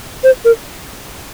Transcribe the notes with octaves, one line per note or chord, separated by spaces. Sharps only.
C5
A#4